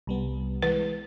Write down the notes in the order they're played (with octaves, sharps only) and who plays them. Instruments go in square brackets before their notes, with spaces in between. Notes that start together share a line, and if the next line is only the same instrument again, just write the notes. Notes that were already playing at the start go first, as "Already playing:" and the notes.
[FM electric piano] C2 G3 B3
[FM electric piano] E3 G#3 [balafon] B4